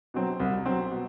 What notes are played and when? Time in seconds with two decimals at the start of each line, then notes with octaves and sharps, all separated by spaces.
0.14 B2 F#3 C4
0.40 C2
0.66 B2 F#3 C4
0.91 B2